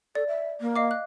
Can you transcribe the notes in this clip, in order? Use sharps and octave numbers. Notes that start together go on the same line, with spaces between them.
A4 D5
E5
A#3
D#5 F5 D6
F#6